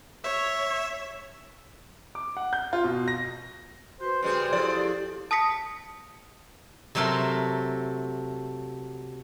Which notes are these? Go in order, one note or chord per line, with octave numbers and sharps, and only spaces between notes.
C#5 E5
D6
F#5
G6
F4
B2
A#6
F#4 B4 C5
C#3 G3 G#4 C5
F3 E4 G4 A4 D5
A5 D#6 A#6 B6 C#7
C3 F#3 A3 A4 A#4 C6